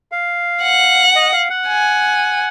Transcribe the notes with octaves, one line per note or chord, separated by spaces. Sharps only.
F5
F#5
D#5
F5
F#5
G#5